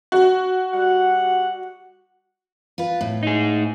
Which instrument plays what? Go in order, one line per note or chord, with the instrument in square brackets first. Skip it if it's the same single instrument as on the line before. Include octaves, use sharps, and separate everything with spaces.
[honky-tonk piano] F#4
[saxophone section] G3 F#5
[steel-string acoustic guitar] F4 B4
A2
[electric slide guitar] D#4 G#4